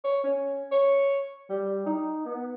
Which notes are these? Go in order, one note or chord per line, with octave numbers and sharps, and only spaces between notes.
C#5
C#4
C#5
G3
D#4
B3